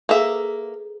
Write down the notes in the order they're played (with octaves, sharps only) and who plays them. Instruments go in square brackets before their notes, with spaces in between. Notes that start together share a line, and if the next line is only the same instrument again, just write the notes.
[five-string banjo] A#3 E5 [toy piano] G#4 A4 B4